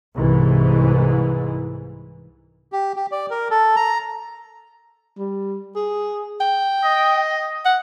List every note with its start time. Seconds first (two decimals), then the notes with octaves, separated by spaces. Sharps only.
0.16 C2 G#2 E3
2.72 G4
2.96 G4
3.12 D5
3.30 A#4
3.51 A4
3.76 A#5
5.18 G3
5.76 G#4
6.40 G5
6.84 D#5
7.65 F#5